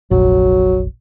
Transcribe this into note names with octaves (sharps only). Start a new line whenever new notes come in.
F1 A#1 F#3